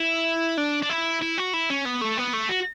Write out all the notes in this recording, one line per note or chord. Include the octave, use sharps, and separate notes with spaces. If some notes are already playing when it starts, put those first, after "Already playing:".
Already playing: E4
D4
D4
E4
E4
F#4
E4
C#4
B3
A3
B3
A3
F#4